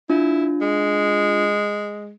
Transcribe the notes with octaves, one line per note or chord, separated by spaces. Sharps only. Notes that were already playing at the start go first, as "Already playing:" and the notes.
D4 E4 F4
G#3